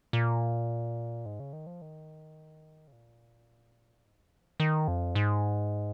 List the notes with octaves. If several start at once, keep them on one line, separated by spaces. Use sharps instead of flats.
A#2
G#2
C#3
D#3
F3
D#3
C#3
A#2
G#2
F2
F3
D#3
F2
G#2